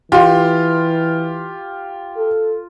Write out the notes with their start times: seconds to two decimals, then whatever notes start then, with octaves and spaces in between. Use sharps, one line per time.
0.12 E3 F4 G4 C6
2.17 A4